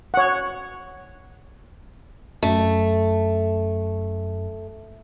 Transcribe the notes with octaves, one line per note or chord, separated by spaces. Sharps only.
C#5 F#5
F#2 A3